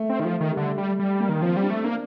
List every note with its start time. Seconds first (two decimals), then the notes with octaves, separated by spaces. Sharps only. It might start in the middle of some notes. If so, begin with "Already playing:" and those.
Already playing: A3
0.09 C4
0.20 D#3
0.25 F3 A3
0.41 D#3
0.52 G3
0.57 D3 A3
0.78 G3
0.99 G3
1.20 A#3
1.29 D#3
1.42 F3 C4
1.57 G3
1.63 D4
1.70 A3
1.84 A#3 D4